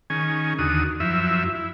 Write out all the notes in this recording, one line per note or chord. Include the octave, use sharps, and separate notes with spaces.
D#3 C#4 G#4 G#5
D#2 D3 F#4 D#6
F#2 F3 E4 E5
E4